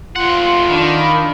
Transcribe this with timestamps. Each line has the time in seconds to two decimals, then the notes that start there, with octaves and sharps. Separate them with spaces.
0.16 F2 F4 F#5 C6
0.70 D#3 D4 B5